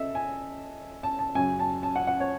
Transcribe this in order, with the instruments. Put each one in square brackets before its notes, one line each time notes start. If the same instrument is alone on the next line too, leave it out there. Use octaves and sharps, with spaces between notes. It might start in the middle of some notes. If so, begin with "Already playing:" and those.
Already playing: [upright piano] C#3 A4 D#5 E5
G#5
A5
A5
F#2 C#3 F#3 G#5
A5
A5
F#5
F#5
C#5